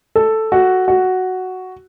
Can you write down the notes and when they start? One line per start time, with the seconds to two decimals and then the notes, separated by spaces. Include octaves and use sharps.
0.16 A4
0.52 F#4
0.88 F#4